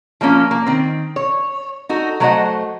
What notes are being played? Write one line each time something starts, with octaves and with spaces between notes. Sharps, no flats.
F3 G3 A#3 C#4 F4
A#3
D#3 C4
C#5
D#4 F#4 A4
F#3 A3 A#4 C5 D#5 F#5